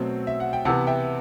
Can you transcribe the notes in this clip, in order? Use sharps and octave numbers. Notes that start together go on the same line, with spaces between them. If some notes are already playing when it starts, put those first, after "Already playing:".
Already playing: B2 F#3 A3 C4
E5
F#5
G5
C3 E3 B3 F#5 A5
E5 G5